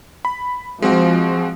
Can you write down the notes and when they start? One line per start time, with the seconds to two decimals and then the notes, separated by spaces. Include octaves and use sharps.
0.25 B5
0.82 F3 G#3 C4 F#4